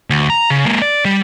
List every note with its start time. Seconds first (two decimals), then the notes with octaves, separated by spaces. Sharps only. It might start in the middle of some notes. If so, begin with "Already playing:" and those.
0.10 D2
0.30 A#5
0.50 C#3
0.65 G#3 A#3
0.82 D5
1.05 G3